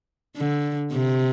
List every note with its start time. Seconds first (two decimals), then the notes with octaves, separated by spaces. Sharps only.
0.37 D3
0.92 C3